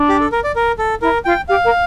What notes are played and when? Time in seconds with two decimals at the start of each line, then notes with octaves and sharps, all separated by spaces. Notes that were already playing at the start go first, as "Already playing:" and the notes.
Already playing: D4
0.09 G4
0.20 A4
0.32 A#4
0.44 D5
0.56 A#4
0.79 A4
1.01 E4 A#4
1.25 F4 G5
1.49 G4 F5
1.64 A#4